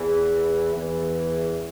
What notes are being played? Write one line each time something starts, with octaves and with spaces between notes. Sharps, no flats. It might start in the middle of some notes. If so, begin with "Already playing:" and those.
Already playing: E2 E3
E2 E3